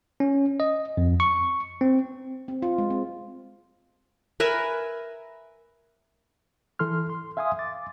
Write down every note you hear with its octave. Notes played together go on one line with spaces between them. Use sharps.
C#4
D#5
F2
C#6
C4
C4
F4
G#3
C4
A#4 B4 E5 G#5
E3 A4 C6 F6
C6
E5 F5 G#5 C6 D#6
D6 A6